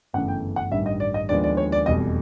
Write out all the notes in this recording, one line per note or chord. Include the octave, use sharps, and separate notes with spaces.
G1 F#2 C#3 E3 A3 F#5
G5
F#5
A1 G2 D#3 G3 E5
D#5
D5
D#5
D#2 D3 F3 G#3 B3 D5
D5
C#5
D5
F1 E2 B2 G3 D#5